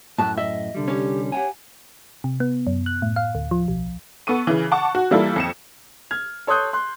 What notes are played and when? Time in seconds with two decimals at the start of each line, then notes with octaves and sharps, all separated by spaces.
0.18 F#2 A2 A5 F#6
0.37 D#5 E5
0.75 C2 D3 G3
0.88 C#4 G4
1.32 G4 C#5 F#5 G#5
2.24 C3
2.40 B3
2.67 F#2
2.86 F#6
3.02 A2
3.16 F5
3.35 D2
3.51 F3
3.68 B1
4.27 B3 A4 C#6 D#7
4.47 C#3 E3
4.72 F#5 A5 C#6 D6
4.95 F#4
5.11 E3 G3 A#3 E4 F4 A4
5.36 F2 C#7 E7
6.11 F6 G#6
6.47 A4 C#5 C6 D#6 F#6 G6
6.73 C6 F#6